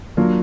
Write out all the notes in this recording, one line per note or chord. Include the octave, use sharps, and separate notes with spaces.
F#3 A#3 D4 F4